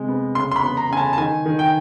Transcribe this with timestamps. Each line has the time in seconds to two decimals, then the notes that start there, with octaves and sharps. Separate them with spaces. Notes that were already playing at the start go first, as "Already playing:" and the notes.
Already playing: C3 G#3
0.08 B3
0.35 C#3 C6
0.51 C6
0.56 B5
0.63 B3
0.77 A#5
0.91 C#3 G#5
0.97 A5
1.13 A5
1.18 D#3 G#5
1.46 D#3
1.59 G5